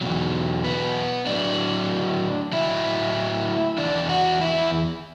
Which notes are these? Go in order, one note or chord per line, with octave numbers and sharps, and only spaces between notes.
E2 B2 F#3
B3 B4
A2 F#3 D4 D5
A2 F#3 E4 E5
E2 E3 D4 D5
F#4 F#5
E4 E5